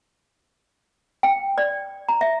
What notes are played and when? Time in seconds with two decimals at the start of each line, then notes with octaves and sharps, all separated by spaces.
1.23 G5
1.58 D5
2.08 A#5
2.21 E5